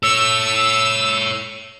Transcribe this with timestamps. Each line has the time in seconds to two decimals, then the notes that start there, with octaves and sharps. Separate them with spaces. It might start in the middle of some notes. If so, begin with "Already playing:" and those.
0.03 A4 C#5 E6